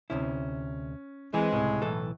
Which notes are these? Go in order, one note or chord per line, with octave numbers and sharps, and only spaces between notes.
D2 C3 C#4 E4
E3 G#3 C4 B4
C#2 A2 C3
B1 E3 A4